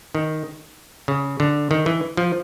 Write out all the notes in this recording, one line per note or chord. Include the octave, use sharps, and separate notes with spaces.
D#3
C#3
D3
D#3
E3
F3